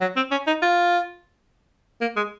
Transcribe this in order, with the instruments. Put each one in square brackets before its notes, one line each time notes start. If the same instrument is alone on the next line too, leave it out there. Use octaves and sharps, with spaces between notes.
[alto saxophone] F#3
C4
C#4
D#4
F4
A#3
G#3